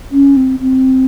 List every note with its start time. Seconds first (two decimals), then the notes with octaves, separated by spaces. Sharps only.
0.12 C#4
0.37 C4
0.60 C4